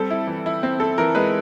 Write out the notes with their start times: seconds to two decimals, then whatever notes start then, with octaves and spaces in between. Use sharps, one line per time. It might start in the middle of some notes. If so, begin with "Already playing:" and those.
Already playing: G3 C4 A4
0.10 E4
0.27 E3
0.46 E4
0.63 C4
0.80 C4 A4
0.98 E3 A#4
1.15 G#3 B4